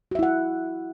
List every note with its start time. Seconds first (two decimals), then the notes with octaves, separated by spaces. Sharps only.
0.11 F#4
0.15 E5
0.19 E4
0.23 F#5